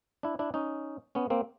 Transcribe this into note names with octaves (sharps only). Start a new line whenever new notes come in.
D4 E4
D4 E4
C#4 D#4
B3 C#4
A#3 C4